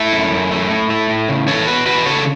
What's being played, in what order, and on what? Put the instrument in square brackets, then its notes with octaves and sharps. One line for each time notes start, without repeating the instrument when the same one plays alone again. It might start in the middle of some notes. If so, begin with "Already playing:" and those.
Already playing: [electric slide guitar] A3 E4 A4
F#2
F#2
A3
A2
A3
A2
C#3
E3 A4 C#5
E2 F#4 B4
E2 F#4 B4
C#3 A4 C#5